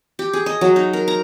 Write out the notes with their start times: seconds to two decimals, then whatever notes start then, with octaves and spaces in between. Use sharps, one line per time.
0.19 G4
0.33 G#4
0.46 D#5
0.61 F#3
0.76 D#4
0.93 A#4
1.08 A#5